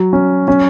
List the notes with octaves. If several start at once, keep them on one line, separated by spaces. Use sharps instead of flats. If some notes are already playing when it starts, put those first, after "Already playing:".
Already playing: F#3
C#4
C#4